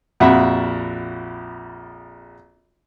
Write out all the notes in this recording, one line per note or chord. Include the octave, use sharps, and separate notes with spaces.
A#1 F2 F#4 E5 F#5 B5